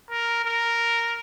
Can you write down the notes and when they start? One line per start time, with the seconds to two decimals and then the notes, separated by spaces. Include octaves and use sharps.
0.10 A#4
0.45 A#4